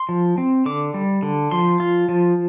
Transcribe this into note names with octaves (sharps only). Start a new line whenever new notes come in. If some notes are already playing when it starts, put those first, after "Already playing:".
Already playing: C6
F3
C4
D3 D6
G3
D3
F3 C6
F4
F3